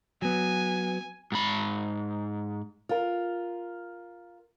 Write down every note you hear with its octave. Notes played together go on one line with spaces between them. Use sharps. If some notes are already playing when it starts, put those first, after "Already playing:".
F#3 B3 G#5
G#2 B5
F4 A#4